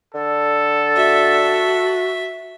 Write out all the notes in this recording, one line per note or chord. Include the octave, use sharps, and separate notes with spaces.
D3 A4
F#4 E5